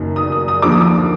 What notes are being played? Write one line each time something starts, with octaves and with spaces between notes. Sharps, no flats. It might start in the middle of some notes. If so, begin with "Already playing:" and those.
Already playing: F#1 F#2 D#3
D#6
D#6
D#6
D#2 D3 F3 D6
D#6
D6